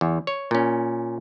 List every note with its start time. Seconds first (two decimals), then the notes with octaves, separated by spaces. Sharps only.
0.01 E2
0.27 C#5
0.51 A#2 C#4